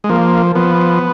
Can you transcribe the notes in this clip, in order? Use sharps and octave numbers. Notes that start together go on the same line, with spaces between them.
G#3
F3 A#3
F3 B3